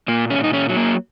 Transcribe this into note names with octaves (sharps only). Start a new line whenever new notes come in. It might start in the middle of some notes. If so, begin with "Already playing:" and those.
A#2 A#3
C#4
A#2
D#4
C#4
F#3
A#3